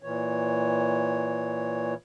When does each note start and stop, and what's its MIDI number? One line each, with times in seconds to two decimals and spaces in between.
0.03 1.94 46
0.03 1.94 52
0.03 1.94 73